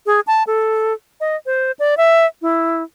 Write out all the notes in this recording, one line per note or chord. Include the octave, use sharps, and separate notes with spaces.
G#4
A5
A4
D#5
C5
D5
E5
E4